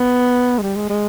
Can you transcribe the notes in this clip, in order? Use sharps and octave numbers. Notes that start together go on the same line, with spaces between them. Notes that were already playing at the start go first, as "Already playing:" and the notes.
Already playing: B3
G#3
G3
G#3
G#3